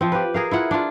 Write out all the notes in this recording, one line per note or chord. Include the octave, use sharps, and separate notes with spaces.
F3 C4
G4 B4
G#4 A#4 F5
E4 F4 F#5
D4 F4